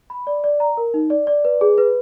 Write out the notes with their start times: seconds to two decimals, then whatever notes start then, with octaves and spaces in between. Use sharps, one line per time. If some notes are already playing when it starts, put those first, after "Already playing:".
0.10 B5
0.27 D5
0.44 D5
0.60 A#5
0.77 A#4
0.94 D#4
1.10 D5
1.27 D5
1.45 B4
1.61 G#4
1.78 B4